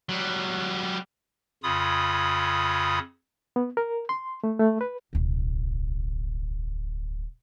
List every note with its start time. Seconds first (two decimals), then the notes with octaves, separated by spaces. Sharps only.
0.09 F#3 G3
1.63 F2 C#3 F4 B5 D#6
3.56 B3
3.77 A#4
4.09 C6
4.44 A3
4.59 A3
4.81 B4
5.13 D1 B1